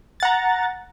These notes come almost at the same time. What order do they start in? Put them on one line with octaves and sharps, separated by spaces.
A6 F#5 A#5